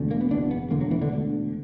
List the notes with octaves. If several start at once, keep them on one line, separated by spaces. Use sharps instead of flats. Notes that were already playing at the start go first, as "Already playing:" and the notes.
Already playing: E1 D2 D3
A#3
B3
F#1 E2 B2 D4
B3
E1 D2 D3 A#3
F#3
E3
D3
E1 D2 D3